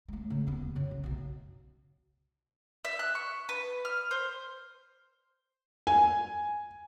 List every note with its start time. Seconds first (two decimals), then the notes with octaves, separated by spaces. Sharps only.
0.08 G#3 A3
0.30 C#3 C#4
0.47 D#1 B3
0.75 F#2 C#3
0.91 C2
1.04 B1 B2
2.85 E5
2.99 F#6
3.15 C#6
3.49 B4
3.85 F6
4.11 C5
5.87 G#5